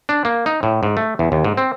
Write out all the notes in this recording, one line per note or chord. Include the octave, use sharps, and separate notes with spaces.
D4
A#3
D#4
A2
G#2
A3
E2
D#2
G#2
C4